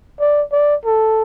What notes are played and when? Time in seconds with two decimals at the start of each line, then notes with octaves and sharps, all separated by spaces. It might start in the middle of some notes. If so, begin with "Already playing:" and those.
0.20 D5
0.52 D5
0.85 A4